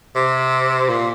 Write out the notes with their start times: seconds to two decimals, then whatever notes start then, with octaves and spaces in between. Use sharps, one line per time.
0.16 C3
0.90 A#2